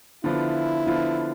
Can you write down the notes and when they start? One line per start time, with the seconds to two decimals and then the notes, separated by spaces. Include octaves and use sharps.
0.24 D3 F3 B3 E4 F4
0.87 D3 F3 B3 F4